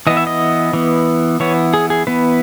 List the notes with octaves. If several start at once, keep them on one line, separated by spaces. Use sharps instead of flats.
E3 B3 D#5
E5
D#5
E3 B3
E3 B3 C#5
G#4
G#4
E3 B3 B4